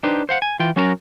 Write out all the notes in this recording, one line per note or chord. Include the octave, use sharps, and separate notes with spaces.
D4 D#4 G4 B4 C5
C5 F5 F#5
G#5
E3 F4 G5
F#3 C#4 F#4 A#4 A5 A#5